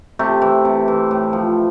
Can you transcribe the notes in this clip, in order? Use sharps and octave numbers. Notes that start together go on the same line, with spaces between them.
C3 A3
E3
C3
E3
A2
F3